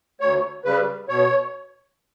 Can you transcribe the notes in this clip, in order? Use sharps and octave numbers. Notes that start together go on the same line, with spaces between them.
D2 C#5
C#3 G3 B4
B2 C#5